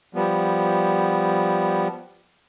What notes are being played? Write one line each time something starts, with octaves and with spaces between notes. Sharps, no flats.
F3 G3 B3